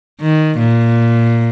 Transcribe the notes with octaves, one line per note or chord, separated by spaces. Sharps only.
D#3
A#2